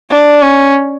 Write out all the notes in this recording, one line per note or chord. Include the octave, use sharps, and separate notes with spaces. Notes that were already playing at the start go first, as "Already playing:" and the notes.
D4
C#4